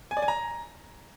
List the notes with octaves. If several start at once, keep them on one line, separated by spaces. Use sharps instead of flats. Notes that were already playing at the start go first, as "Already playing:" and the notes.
G#5
D5
G#5
A#5